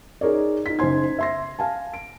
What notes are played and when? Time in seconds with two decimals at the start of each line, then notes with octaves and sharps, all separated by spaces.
0.21 D#4 G#4 A#4 C#5 D5
0.66 D#4 B6
0.79 F#1 D#4 C5 G#5 C6 G#6
1.18 E5 C6 A#6
1.59 F5 G#5 A5
1.94 D7